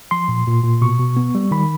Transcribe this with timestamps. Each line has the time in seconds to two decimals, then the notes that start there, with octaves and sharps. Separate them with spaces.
0.11 F3 C6
0.28 A#2
0.47 A#2
0.64 A#2
0.82 B2 C#6
1.00 B2
1.17 B3
1.35 G3
1.51 D#3 B5